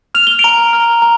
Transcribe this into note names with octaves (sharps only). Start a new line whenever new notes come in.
F6 F7
G7
D7 F7
A#5
F6
A#5